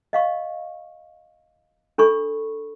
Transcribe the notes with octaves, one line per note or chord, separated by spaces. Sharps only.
D#5 F5 C#6
D4 A4 B5 C#6